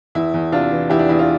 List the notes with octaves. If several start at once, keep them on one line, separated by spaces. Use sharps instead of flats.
E2 E4
E2
C3 D4 F4
E3
E2 E4 G4
D4
E2 E4
D4 F4